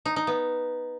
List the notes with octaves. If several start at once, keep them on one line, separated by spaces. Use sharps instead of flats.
D#4
D#4
B3